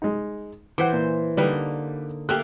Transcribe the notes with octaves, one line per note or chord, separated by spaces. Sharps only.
G#3 D#4
E3 C5 F#5 D6
A#2
D3 G3 A#3 D#4 B4
A3 A#3 G4 F5 F#6